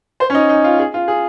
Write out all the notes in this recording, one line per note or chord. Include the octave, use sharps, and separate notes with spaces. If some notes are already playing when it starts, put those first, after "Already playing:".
C5
C#4
D#4
D#4
F4
G#4
F4
G#4